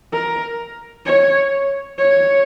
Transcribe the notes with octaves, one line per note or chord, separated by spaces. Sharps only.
A#4
C#5
C#5